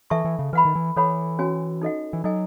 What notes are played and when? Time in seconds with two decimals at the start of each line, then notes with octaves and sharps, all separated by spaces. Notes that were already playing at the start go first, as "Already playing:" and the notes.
0.10 E3 A4 E5 A5 C#6
0.25 E3
0.39 C#3
0.53 E3 B4 F#5 B5
0.65 D#3
0.75 E3
0.96 E3 A4 C#5 F#5 B5
1.39 C#4 F#4 C#5 G#5
1.82 D#4 A4 D#5 F#5
2.13 E3
2.24 F#3 D#4 A4 D#5 G#5